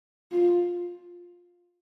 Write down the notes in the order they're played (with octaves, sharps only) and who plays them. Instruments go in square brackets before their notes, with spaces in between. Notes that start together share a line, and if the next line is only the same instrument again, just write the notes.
[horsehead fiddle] F4